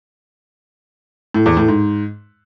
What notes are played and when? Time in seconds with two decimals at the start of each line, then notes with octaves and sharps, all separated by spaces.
1.34 A2
1.46 E2
1.57 A2
1.68 G#2